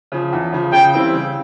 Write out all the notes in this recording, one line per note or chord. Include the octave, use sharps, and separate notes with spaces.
C#3 F3
E2
C#3 F3
C#3 G5
E3 G3 C4 E4
C#3